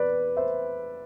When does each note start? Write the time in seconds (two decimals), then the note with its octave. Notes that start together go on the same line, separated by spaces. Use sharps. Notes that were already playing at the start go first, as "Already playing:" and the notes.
Already playing: E2 B4 D5
0.37 C5 E5